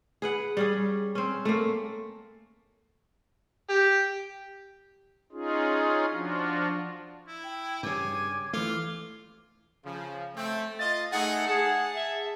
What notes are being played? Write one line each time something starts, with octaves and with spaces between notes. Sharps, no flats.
G#4 B4 F#5
G3 C#4 G#4
C4 C#4
A3 A#3
G4
C#4 D#4 F4 G#4
F3 D4 F4 F#4
E4
G5
G2 C#3 G#5 D6
E3 A3 F4
C#3 F3
A3 C4
F4 D#5 A6
A3 D#4 G#4 F#5
G#4 A5
E5